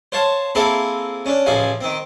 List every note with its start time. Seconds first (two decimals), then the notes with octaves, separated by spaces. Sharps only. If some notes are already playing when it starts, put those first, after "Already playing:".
0.12 C5 C#5 F5 A5
0.55 A#3 C4 E4 G#4 A4 F5
1.26 C#4 D4
1.46 A1 C#3 F3 F5 G#5
1.81 D#3 C4